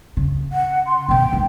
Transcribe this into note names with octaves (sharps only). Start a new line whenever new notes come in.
C#3
F#5
C6
B2 D#3 G5
G#2 D#3